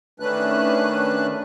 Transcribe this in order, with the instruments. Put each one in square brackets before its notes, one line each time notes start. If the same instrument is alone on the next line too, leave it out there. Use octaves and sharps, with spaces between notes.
[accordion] D#3 A3 C#4 D4 B4 F#6